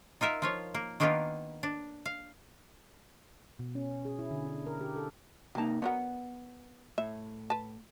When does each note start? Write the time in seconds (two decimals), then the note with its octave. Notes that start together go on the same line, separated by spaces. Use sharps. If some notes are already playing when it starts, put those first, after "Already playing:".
0.21 D#4 F4 A#4 E5
0.42 F3 F4 C#5
0.74 A#3
1.00 D#3 A#3 B3 D4 D#4 F4
1.63 D4
2.05 F5
3.59 B2
3.75 C#4
4.05 G#4
4.19 E4
4.31 D3
4.46 D4
4.66 A#4
4.81 G4
4.96 A4
5.55 C3 G3 A#3 D#4 A5
5.82 D3 F#3 B3 A#4 F#5
6.98 A2 E5
7.50 B4 A5